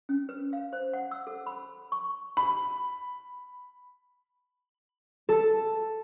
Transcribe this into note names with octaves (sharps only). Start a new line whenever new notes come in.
C#4
B4
F5
C5
F#5
E6
A4
B5
C#6
B5
A4